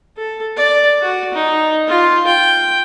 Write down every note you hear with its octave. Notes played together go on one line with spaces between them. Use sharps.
A4
D5
F#4
D#4
F4
G5